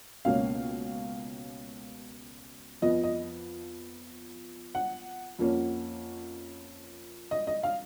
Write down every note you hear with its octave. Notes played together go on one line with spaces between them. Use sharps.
C#2 B2 A#3 C#4 F5
F2 F3 B3 D#5
D#5
F#5
F2 F3 A#3 C#4
D#5
D#5
F5